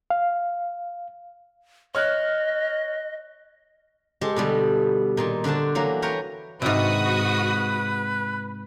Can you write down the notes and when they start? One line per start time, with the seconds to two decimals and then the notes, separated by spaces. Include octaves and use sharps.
0.10 F5
1.95 C#5 D#5 F6 F#6
4.21 G#3 G4 A4 C5
4.36 B2 D3 G3
5.17 A#2 D#3 C6
5.44 D3 D4 F#4 C5 A5
5.75 E3 F#3 A#3
6.02 A#4 B4 C#5 G5 A#5
6.62 G#1 G#2 C3 F#4 B4 D#6